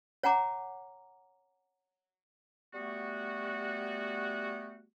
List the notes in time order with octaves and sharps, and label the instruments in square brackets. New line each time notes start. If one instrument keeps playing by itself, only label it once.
[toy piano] C#5 F#5 G#5 A#5 D6
[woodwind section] G3 A3 B3 F#4